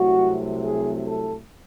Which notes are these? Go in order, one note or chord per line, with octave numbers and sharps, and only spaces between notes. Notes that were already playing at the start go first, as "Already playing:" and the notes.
Already playing: C2 C3 F#3 A3 F#4
G#4
A4